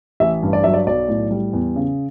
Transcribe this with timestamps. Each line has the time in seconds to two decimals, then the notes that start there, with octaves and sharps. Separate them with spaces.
0.20 A1 E5
0.43 G2
0.53 D5
0.64 F#3 E5
0.74 D5
0.87 B1 D5
1.09 A2
1.31 G3
1.53 E2
1.76 C#3